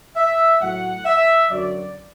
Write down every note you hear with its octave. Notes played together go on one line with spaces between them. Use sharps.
E5
A2 F#3 F#5
E5
F#2 D3 F#3 D5